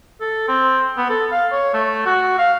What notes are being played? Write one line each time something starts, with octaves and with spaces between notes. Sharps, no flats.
A4
C4
B3
A4
F5
C#5
A3
F#4
F5